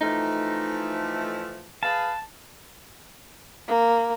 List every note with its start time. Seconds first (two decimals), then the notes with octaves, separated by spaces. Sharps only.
0.01 E3 F3 A3 D#4
1.83 G#4 B4 F5 A5
3.68 A#3